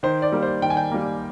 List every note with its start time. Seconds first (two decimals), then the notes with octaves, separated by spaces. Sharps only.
0.03 D#3 C5
0.22 D5
0.32 G3 A#3
0.43 C5
0.62 D#3 G5
0.70 G#5
0.77 G5
0.91 G3 A#3